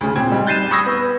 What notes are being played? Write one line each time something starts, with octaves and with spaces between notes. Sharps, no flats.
D2 C#3
A#2 C4 G#6
G3 D#4
F#6 G6 A6 C7 D#7 E7
B5 C#6 D#6 E6 G#6 A#6
B3